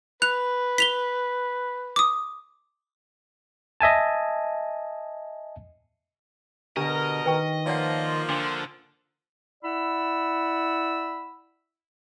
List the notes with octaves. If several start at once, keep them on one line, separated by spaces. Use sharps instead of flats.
B4 F#6 F7
B6 F7 G7
D6 D#6
D#5 E5 G#5 A5
B2 D3 D4 G4 A#4 D#5 A#5
D#3 B4 G5 C#6
F3 A#3 F4 C#5 D5 F#5
D3 D4 D6
E4 D5 F#5 B5 E6